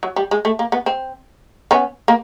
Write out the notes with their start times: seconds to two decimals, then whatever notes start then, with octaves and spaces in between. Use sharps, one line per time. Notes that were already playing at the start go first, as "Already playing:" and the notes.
0.03 F#3
0.16 G3
0.31 G#3
0.45 A3
0.59 A#3
0.72 B3
0.86 C4
1.71 B3 C#4
2.08 A#3